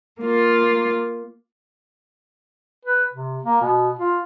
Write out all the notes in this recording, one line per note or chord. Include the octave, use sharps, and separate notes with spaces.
A#3 F4
B4
C3
A#3
B2
F4